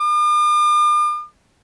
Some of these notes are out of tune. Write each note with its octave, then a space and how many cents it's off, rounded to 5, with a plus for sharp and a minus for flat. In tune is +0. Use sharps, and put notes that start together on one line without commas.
D6 +45